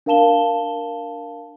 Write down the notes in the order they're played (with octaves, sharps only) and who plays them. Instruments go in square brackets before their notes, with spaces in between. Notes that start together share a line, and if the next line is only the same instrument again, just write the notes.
[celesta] D4 A#4 F5 A5 E7 G7